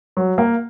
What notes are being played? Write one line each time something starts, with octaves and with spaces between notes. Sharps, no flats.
F#3
A#3